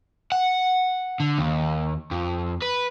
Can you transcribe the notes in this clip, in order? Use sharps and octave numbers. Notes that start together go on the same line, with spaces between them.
F#5
D3
D#2
F2
B4